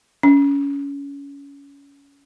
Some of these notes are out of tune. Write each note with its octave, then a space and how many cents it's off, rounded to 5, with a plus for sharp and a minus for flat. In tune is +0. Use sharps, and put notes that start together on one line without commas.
C#4 +25